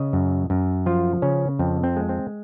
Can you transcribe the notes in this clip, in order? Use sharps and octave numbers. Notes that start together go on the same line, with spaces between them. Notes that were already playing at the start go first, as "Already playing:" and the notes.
Already playing: C#3 D#5
F#2
F#2
F3 F4
C#3 C#4
F2 C4
C4
G#3
C4